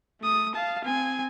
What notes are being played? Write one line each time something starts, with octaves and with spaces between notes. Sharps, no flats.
A3 D#6
F5 A5
C4 G#5